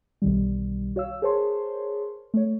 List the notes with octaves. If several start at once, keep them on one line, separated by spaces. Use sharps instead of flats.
B1 D#3 G3
F#4 C#5 F5 E6
G#4 A#4 C5 C#5 A5 C6
A3 C#5